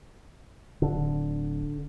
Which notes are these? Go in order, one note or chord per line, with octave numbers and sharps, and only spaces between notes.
D1 D3